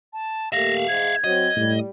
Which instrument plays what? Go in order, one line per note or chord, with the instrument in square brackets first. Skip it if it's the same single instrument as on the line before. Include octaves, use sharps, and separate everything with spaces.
[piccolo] A5
[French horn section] A3 A#3 G4 [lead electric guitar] E5 F5 [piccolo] A#6
[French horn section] G#2 [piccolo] G#6
[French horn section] F#3 C4 [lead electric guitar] D#5
[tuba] A2 [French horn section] G3